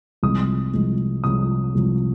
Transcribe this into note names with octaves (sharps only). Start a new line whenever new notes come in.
C2 C3 F3 G#3 D#6
C2 C3 F3 G#3
C2 C3 F3 G#3 D#6
C2 C3 F3 G#3